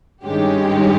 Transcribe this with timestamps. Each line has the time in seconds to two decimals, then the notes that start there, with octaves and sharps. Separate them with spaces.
0.24 G2 D#3 G#3 C#4 G4